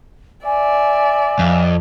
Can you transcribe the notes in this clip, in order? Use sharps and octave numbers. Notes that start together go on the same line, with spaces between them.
D5 E5 G#5
F2